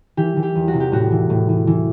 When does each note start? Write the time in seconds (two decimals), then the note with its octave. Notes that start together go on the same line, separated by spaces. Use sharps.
0.17 E3 G4
0.37 E3
0.43 G4
0.56 E2
0.68 F#4
0.74 C3
0.80 G4
0.92 A2 F#4
1.11 E3
1.30 A2
1.49 E3
1.67 E3